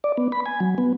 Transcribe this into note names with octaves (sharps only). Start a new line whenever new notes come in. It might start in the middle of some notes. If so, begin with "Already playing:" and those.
D5
B3
B5
G#5
F#3
B3